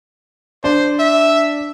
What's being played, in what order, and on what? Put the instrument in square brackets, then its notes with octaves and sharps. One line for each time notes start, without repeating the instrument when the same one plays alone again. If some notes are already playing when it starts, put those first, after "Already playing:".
[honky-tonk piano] D4 [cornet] C5
[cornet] E5